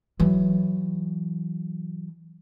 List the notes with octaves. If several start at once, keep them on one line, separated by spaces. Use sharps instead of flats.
E3 F#3